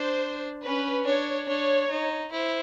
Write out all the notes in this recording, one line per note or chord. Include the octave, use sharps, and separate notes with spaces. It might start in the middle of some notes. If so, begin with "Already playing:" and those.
Already playing: D4 C5
C#4 B4
D4 C#5
D4 C#5
D#4
E4 C5